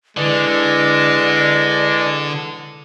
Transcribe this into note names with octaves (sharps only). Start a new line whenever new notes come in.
D3 G#3 E4 B4 D5